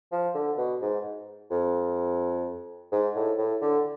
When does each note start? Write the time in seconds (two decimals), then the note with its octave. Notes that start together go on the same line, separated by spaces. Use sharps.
0.12 F3
0.35 D3
0.58 B2
0.82 G#2
1.51 F2
2.92 G#2
3.16 A2
3.39 A2
3.62 D3